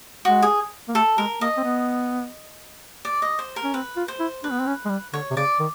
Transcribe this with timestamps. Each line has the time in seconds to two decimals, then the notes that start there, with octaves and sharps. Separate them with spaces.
0.25 G#3 F#4
0.42 G#4
0.88 A#3
0.95 A3 A4
1.18 G#3 A#4
1.41 A#3 D#5
1.57 C4
1.64 B3
3.05 D5
3.22 D#5
3.39 C5
3.56 A#4
3.64 C#4
3.74 C4 B4
3.97 F4
4.08 C5
4.20 E4
4.44 D4 B4
4.52 B3
4.60 C4
4.67 C#4
4.85 G#3
4.90 G3
5.13 D3 C#5
5.31 C3
5.37 C#3 D5
5.60 D#3